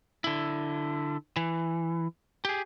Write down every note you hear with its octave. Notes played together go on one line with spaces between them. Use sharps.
D3 E4
E3
G4 G#4